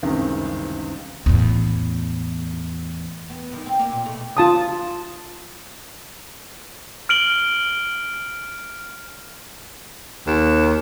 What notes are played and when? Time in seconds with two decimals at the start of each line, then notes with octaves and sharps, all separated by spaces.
0.03 F#1 C#2 G2 C3 D#3 E3
1.26 E2 A2
3.30 B3
3.53 G2 D#3
3.66 C4
3.79 A#3 D5
3.92 A#2
4.06 B2 A3
4.37 F4 A5 D#6
7.09 F6 D7 F#7 G7
10.27 D#2